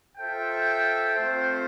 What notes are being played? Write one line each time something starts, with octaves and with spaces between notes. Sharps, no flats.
F4 A4 C5 E5 G5
A3 C4 F4 C5